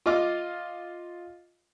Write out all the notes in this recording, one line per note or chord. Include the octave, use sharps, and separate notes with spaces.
F4 D#5 D6 F6